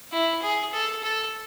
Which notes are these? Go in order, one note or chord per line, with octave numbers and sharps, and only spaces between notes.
E4
G#4
A4
A4